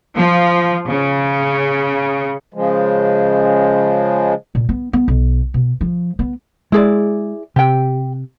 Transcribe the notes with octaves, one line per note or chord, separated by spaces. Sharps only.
F3
C#3
C#3 F3 G#3
A#2
B3
B3
B1
B2
F3
B3
G#3 E4 G#4 D5
C3 G4 G5